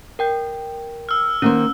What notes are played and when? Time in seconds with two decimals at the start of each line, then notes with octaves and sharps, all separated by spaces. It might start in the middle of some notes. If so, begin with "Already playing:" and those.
0.19 A#4 G5 G6
1.09 E6 F6
1.42 D#3 A#3 C#4 C5